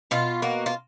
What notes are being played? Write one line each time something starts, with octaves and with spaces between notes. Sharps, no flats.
B2 F4
A#3 F#4
F4